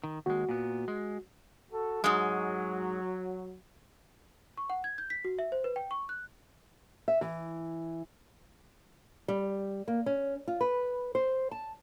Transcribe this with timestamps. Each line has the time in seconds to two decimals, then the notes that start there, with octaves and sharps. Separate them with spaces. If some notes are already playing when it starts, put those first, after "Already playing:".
0.04 D#3
0.26 D#2 G#3 F#4
0.49 A#2 B3
0.88 G#3
1.71 F#4 A4
2.04 G#2 F#3 G#3
4.58 C#6
4.70 F#5
4.84 G#6
4.98 G6
5.10 B6
5.25 F#4
5.39 E5
5.52 C5
5.64 B4
5.76 G5
5.91 C#6
6.09 F#6
7.08 E5
7.21 E3
9.28 G3
9.88 A#3
10.06 C#4
10.48 F4
10.61 B4
11.15 C5
11.51 A5